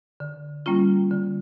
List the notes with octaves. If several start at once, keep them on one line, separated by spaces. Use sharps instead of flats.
D3
G3 A#3 C#4 F4
D3